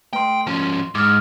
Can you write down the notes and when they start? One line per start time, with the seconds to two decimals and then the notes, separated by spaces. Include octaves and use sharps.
0.13 A3 B4 G5 C6
0.47 F3 C#4 C6
0.95 G#2 D6 D#6 F6